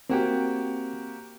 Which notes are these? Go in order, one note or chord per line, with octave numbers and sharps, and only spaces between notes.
A#3 C4 F#4 G4